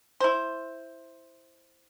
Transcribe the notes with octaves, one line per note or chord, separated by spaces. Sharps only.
E4 C5